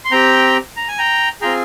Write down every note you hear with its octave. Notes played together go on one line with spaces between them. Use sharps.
C6
C4 G4 G5 A#5
A#5
G#5
G5 A#5
C4 F4 G#4 G5 A#5